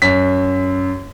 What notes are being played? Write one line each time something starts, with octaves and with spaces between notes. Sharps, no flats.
F#2 B6